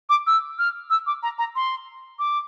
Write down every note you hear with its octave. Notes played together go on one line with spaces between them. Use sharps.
D6
E6
F6
E6
D6
A#5
A#5
C6
D6